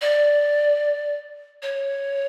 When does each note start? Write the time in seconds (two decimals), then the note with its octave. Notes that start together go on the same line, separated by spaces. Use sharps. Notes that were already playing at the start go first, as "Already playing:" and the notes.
0.02 D5
1.63 C#5